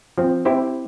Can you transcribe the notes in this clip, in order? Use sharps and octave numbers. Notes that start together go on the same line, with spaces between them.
F3 C4
C4 E4 G4 C5